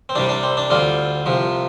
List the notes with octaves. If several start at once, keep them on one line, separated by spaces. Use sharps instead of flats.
C4
C2 C3 G3 D4
D4
C4
D4
D2 D3 G3 C4 F4
C2 C3 F3